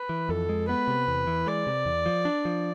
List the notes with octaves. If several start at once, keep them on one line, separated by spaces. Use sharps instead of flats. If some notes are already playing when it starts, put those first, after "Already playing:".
Already playing: B4
E3
F2 A4
G#3
B3 B4
C3
E2
E3
G#3 D5
C3
E2
F3
D4
F3